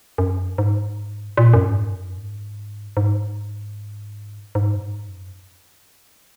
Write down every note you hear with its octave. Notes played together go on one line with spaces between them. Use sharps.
F#2
G#2
A#2
F#2
G#2
F#2
G#2
G#2
G#2
F#2
G#2
F#2